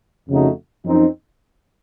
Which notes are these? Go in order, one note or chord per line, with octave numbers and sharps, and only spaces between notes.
F2 C#3 A3 D#4 F#4
F#2 F3 C4 D#4